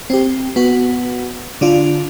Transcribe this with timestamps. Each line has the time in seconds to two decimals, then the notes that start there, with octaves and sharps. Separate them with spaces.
0.10 C4 G4
0.56 B3 F#4
1.61 D3 D4 F4